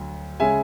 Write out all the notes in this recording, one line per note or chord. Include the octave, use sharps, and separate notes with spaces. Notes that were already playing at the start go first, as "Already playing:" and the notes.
Already playing: D2 F#3
C#3 G#3 E5 G#5